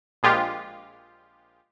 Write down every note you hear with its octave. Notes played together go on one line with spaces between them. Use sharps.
A#1 G#3 F4 G4